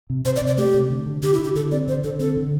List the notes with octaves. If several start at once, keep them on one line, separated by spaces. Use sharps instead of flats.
C3
C3 C5
D5
C3
D5
A3 G4
C3
D3
D3
D3 G4
D3 E4
G4
D3 A4
C4 D5
D3 C5
D3 A4
C4 A4
D3